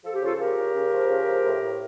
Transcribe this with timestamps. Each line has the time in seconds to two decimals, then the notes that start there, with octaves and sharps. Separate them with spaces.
0.04 F3 A4
0.14 G4
0.22 C#3 F4 A4
0.33 A4
0.39 F3 G4 A#4
0.57 C#3
0.74 C#3
0.93 F3
1.10 C#3
1.27 F3
1.45 A2
1.62 A2